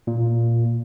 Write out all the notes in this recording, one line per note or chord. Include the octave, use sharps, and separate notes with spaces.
A#2